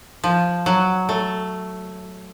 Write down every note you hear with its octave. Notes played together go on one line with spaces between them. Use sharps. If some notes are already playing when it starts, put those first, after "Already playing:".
F3
F#3
A3